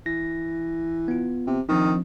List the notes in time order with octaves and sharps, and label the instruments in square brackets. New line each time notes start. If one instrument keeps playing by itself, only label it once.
[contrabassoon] E3 [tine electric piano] A#6
[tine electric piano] B3 F4
[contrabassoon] C3
[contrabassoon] D#3 [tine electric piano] F3 C4 D4